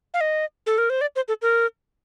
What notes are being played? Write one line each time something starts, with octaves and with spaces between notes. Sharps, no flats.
F5
D#5
A4
A#4
C5
D5
C5
A4
A#4